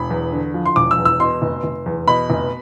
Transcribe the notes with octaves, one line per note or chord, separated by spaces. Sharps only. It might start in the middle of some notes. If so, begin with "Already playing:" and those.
Already playing: E1 B5
E2
D3
F3
C6
E1 D6
E6
E2
E6
B2 C6
F1
F1
E2
B2 B5
F1